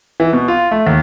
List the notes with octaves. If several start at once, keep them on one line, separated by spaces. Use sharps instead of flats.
E3
B2
F4
A3
D#2